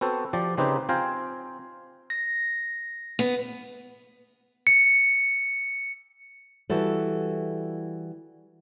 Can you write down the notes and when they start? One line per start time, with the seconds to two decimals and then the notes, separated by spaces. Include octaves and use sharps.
0.01 B3 C4 F#4 A4 C5
0.33 F3 G4 D5
0.58 C#3 C4 D#4 G4 B4 C5
0.89 C4 F4 F5 G5 G#5 A#5
2.10 A#6
3.19 B3
4.67 C#7
6.70 E3 G3 F#4 A4